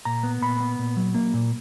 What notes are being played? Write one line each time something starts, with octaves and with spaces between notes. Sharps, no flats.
A#2 A#5
B3
A#2 B5
B3
A#2
F#3
A#3
A#2